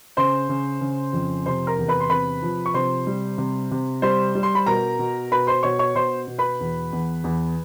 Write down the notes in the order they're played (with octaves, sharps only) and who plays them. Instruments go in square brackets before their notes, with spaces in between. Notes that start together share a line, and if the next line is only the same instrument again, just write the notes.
[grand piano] C#3 C5 C6
C#3
C#3
F2
C3 C5 C6
A#4 A#5
E2
B4 B5
C6
C3 B4 B5
F3
C#6
C3 C5 C6
G3
C3
C3
G3 C5 C6
G3
C6
B5
B2 A#4 A#5
B2
B2 B4 B5
C5 C6
B2 C#5 C#6
C#5 C#6
B2 C5 C6
B2
B4 B5
E2
E2
E2